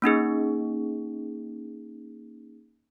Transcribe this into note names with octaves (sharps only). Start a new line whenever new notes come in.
A#3 C#4 D#4 G#4